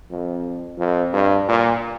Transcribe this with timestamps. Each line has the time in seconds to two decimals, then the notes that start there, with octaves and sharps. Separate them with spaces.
0.11 F2
0.79 F2
1.14 G2
1.49 A#2